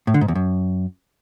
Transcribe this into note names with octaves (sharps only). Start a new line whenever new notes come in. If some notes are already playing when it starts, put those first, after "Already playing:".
A2
D3
G#2
E2
F#2